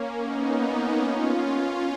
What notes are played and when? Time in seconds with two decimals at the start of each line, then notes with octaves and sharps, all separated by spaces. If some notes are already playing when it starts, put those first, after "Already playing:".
Already playing: A#3 C#4
0.19 B3 D#4
1.01 C#4 F4